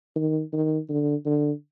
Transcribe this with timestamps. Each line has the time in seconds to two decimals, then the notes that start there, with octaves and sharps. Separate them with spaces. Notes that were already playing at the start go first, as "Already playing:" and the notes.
0.16 D#3
0.53 D#3
0.89 D3
1.26 D3